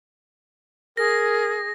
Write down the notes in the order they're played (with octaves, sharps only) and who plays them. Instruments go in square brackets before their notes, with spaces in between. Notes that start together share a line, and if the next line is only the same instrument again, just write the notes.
[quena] G#4 [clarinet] A#4 [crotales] A#6